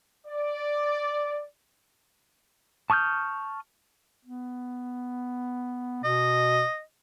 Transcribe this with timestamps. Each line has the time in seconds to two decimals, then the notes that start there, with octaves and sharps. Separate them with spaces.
0.27 D5
2.90 A5 C#6 D#6 F6 G6
4.25 B3
6.04 B2 D#5